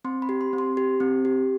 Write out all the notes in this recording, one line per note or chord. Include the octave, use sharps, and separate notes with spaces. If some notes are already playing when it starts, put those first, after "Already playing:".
C4 C6
B5
G4
C6
C4
C6
G4
C4
G4